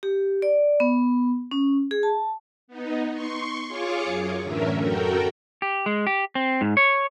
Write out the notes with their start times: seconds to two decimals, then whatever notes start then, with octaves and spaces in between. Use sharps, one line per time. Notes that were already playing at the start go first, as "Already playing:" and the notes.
0.03 G4
0.42 D5
0.80 B3
1.51 C#4
1.91 G#4
2.03 A5
2.68 B3 D#4
3.12 C6 C#6
3.68 F4 G#4 C#5 C#6 D6
4.04 F#2
4.42 A2 D3 E3 C#4 A#4 E5
4.82 F#2 F#4 A4 A#4 G5
5.62 G4
5.86 G#3
6.07 G4
6.35 C4
6.61 G#2
6.77 C#5